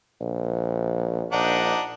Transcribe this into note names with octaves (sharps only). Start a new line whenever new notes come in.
A#1
A#1 D4 D#4 F#5